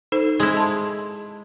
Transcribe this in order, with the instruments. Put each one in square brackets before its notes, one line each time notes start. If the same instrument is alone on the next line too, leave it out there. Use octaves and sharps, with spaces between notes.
[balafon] D#4 A4 C5
[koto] G#3 E4
[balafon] A5 C6